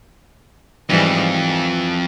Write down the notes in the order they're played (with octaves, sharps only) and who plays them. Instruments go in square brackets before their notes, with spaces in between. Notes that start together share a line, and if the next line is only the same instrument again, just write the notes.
[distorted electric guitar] F2 [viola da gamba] G#2 E3 G3
[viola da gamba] E3